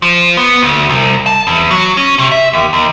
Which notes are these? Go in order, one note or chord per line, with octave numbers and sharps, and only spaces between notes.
F3
B3
D2
C2
A5
E2
F#3
C#4
C3
E5
D#2
D#2